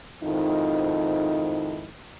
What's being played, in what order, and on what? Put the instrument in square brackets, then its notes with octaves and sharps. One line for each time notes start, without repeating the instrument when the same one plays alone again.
[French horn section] F2 G#2 D#3 F3 D#4 E4